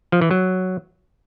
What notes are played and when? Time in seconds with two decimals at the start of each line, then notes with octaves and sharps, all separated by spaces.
0.12 F3
0.22 E3
0.31 F#3